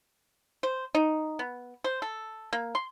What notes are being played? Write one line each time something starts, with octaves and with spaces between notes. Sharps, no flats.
C5
D#4
B3
C5
A4
A#3
C6